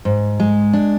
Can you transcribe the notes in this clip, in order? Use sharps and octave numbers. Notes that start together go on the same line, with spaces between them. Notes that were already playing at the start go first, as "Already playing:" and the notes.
G#2
G#3
D4